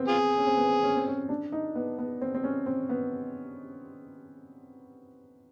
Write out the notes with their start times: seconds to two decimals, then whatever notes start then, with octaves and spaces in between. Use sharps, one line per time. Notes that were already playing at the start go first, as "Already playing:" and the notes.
Already playing: B3 C4
0.08 F4 G#4
0.38 C#4
0.47 C4
0.57 B3
0.66 C4
0.83 C#4
0.96 C4
1.07 C#4
1.29 D4
1.52 D#4
1.75 B3
1.98 B3
2.21 C4
2.35 C4
2.44 C#4
2.66 C4
2.89 B3